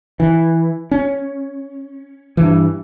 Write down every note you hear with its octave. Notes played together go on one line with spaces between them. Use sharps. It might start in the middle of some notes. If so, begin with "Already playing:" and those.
E3
C#4
G2 E3